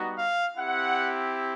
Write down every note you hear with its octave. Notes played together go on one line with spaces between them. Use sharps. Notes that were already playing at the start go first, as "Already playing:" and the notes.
Already playing: G3 B3 D#4 F#4
F5
C4 E4 G4 F#5